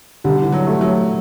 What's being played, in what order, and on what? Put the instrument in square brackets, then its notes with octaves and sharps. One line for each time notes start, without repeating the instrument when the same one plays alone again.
[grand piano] D3 [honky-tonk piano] G3
[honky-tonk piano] E3
F#3
[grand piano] A3
[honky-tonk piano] F#3